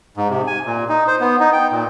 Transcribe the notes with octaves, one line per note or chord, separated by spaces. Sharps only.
G#2
C3
G#5
A#2
D#4
C5
B3
D#4
G5
A#2